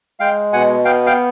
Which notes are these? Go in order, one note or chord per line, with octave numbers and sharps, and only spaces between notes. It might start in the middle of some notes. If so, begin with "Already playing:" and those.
G#3 F5 G5
B2 F#5 G#5
B3 F5 G5
F5 G5